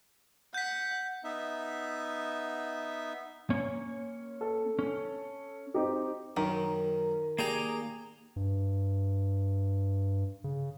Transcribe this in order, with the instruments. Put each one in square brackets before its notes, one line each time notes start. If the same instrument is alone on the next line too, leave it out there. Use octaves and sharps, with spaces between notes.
[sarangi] F#5 [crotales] G6 B6
[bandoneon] B3 D#4 E5
[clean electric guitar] A#3 C#4 C#5
[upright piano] A4
[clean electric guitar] C#4
[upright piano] C4 D#4 G4
[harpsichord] F#2 [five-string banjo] D#3 [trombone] A#4
[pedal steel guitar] A#3 G#4 A#5 [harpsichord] G4 D5 G5
[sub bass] G2
C#3